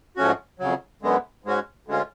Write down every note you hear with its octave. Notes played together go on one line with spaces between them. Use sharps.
G#2 F3 A3 C#4 F#4
F2 C#3 F#3
F#2 D3 G#3 B3
G#2 G#3 C#4 F#4
D2 D3 G#3 C#4 F4